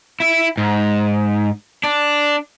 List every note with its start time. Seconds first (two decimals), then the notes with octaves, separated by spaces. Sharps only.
0.20 E4
0.57 G#2
1.83 D4